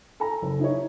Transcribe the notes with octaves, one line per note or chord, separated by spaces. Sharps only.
A4 A#5
F#1
D#4 E4 G4 C#5